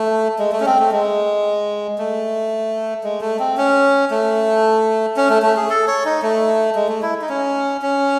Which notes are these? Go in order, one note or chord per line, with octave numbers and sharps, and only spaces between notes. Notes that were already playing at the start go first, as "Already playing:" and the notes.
Already playing: A3
G#3
A3
C#4
C4
A3
G#3
A3
G#3
A3
C4
C#4
A3
C#4
A3
A3
G#4
A4
C#5
D#4
A3
G#3
A3
E4
D#4
C#4
C#4